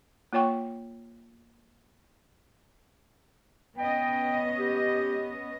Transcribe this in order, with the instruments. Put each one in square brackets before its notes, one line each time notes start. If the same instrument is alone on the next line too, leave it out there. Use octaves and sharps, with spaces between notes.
[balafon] A#3 F4 C#5 G5 C#6
[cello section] B3 C#4 D#5 [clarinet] G5
[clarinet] G4